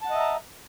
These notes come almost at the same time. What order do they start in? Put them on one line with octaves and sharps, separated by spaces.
A5 F#5 D#5 E5 A#5